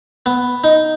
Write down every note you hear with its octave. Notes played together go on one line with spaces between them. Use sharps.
B3
D#4